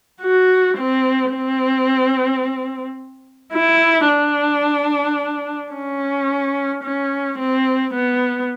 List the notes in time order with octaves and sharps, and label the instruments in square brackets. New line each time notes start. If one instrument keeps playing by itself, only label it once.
[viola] F#4
C4
C4
E4
D4
C#4
C#4
C4
B3